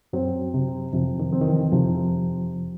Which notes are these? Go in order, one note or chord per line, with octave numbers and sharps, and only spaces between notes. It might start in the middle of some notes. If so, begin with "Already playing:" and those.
F#2 F#3 C4
C3
F2 C3 F3
D#3
C4
D#3
E3
F2 C3 F3